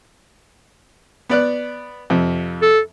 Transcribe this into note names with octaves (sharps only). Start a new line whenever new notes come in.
B3 D5 F#6
F2 C3
A4